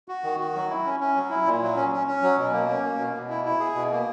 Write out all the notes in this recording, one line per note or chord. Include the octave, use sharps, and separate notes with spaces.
F#4
D#3
F#4
F#3
E4
C#4
C#4
F#3
E4
A#2
F#3
C#4
C#4
C#4
F#3
B2
A#3
C#4
A#3
B2
B2
E4
E4
G#4
B2
A#3